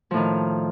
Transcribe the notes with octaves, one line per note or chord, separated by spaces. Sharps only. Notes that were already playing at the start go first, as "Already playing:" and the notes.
A2 D#3 F3